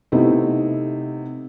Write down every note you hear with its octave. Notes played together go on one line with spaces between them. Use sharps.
C3 A3 B3 D#4 E4